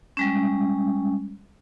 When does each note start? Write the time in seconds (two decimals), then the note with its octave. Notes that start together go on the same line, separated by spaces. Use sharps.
0.17 G3 G#3 C#4